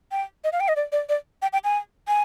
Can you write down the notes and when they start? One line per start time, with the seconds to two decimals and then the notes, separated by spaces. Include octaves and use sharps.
0.12 G5
0.44 D#5
0.52 F5
0.60 G5
0.68 D#5
0.76 D5
0.92 D5
1.09 D5
1.42 G5
1.53 G5
1.64 G#5
2.08 G#5